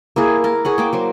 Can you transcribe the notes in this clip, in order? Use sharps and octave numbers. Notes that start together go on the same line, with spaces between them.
A#3 E4 G#4
A#4 A5
G#4 C#5 F#5
A#3 G5 D6
F#3 C5